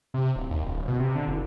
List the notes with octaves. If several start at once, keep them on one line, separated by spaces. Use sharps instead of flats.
C3
D1
D#2
D1
B2
C3
D3
F#1